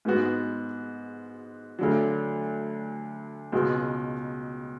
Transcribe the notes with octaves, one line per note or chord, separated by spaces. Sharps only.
G#2 G#3 B3 F#4
D2 D3 F#3
C#2 B2 G#3 B3 F#4